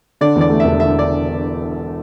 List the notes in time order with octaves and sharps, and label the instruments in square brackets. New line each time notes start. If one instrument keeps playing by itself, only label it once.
[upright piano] D3 [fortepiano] D5
[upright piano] E2
[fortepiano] D5
[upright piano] A3
[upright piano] E1 [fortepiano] E5
[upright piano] D3 [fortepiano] E5
[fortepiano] D5